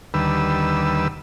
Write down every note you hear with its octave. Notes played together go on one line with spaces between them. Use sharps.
D#2 D3 G3 B4 E6